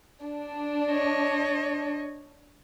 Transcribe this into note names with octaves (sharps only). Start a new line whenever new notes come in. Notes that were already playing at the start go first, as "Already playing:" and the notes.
D4
C#5 D#5